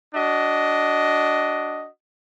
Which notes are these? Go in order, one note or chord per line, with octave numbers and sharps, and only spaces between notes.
D4 F#4 D#5